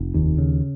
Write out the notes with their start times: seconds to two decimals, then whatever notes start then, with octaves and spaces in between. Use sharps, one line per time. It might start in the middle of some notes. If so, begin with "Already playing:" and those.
Already playing: F1
0.14 D#2
0.38 C#3